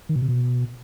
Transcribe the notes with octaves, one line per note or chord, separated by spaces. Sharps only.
D#3
B2
C3
B2